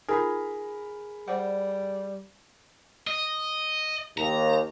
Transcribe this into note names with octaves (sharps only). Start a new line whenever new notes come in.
D#4 F4 G#4 A#4 B5 G#6
G3 C5 D5 F#5
D#5
D#2 A#5